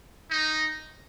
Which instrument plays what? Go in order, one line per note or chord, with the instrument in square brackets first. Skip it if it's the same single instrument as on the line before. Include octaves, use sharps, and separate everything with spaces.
[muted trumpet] D#4